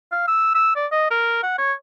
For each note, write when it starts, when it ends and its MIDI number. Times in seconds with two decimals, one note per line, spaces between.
0.12 0.24 77
0.28 0.53 88
0.54 0.76 88
0.76 0.86 74
0.92 1.07 75
1.11 1.39 70
1.43 1.54 78
1.58 1.73 73